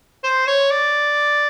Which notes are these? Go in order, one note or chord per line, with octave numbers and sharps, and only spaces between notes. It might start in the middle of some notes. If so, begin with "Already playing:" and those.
C5
C#5
D5